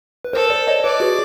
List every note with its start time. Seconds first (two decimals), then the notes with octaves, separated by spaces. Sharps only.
0.25 B4
0.33 A4 A#4 C5
0.50 C5 D5
0.67 C#5 D#5
0.84 B4 C#5 D5
1.00 F#4 G#4